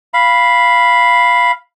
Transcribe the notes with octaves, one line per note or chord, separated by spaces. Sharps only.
F5 B5